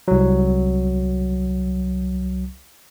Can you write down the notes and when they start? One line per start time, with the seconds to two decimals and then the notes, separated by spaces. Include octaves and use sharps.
0.08 C2 F#3